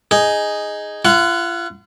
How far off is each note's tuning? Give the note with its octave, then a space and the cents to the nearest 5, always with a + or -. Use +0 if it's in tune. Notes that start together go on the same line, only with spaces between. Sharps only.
D#4 +0 G#4 +0
F4 -40 F#5 -5